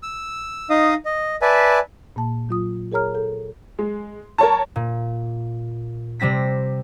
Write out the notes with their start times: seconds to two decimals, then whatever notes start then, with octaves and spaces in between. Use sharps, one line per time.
0.03 E6
0.70 D#4 D#5 F5 D#6
1.05 D#5
1.42 B4 D5 E5 G#5 A5
2.16 A#2 A#3 A5
2.49 F#3 F4 D#6
2.92 G#4 A#4 C#5 A#5 F6
3.15 A4
3.79 G#3
4.38 A#4 C#5 A5
4.76 A#2
6.20 C3 G3 C4 A#6 B6